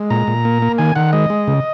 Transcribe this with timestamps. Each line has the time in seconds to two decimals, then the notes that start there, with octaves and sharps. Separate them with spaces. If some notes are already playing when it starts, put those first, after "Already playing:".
Already playing: G#3
0.10 A#2 A#5
0.27 A#2
0.45 A#3
0.62 A#3
0.78 D#3 G#5
0.96 D#3 F#5
1.13 G#3 D#5
1.30 G#3
1.48 C#3